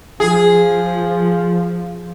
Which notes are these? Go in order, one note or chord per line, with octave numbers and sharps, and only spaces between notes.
F3 G#4